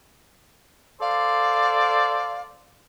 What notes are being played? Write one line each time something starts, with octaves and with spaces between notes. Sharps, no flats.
A4 C5 D5 F5